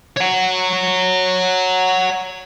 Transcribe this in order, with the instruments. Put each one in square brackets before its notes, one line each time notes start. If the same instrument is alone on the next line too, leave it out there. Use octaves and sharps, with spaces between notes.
[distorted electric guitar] C#5 F#5